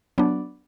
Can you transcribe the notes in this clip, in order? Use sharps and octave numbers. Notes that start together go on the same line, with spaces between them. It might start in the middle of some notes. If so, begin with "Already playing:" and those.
F#3 B3 D4